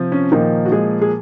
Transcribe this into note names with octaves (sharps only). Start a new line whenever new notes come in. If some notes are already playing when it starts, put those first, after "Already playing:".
Already playing: C3 F3
C#4
A#2 D#3 F3 D#4
F#4
G#3 G#4
G#4